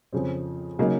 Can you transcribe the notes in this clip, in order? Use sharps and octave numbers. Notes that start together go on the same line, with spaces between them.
F2 C#3 F3 C4
C#3 F#3 A#3 D#4